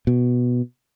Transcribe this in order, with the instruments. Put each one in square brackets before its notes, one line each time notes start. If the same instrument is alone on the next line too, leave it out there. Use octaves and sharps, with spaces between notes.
[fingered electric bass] B2